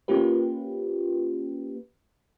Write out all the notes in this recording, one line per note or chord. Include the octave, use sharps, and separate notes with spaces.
A#3 C#4 F4 G4 B4